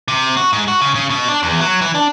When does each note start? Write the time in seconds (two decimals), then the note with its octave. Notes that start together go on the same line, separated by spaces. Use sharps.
0.08 C3
0.37 F#4
0.53 G#2
0.68 F#4
0.81 C#3
0.95 C#3
1.10 B2
1.28 D4
1.43 E2
1.61 F#3
1.81 E3
1.95 D4